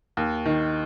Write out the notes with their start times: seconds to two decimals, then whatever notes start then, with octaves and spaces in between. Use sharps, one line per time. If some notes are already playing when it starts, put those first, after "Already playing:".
0.17 D#2
0.46 D#3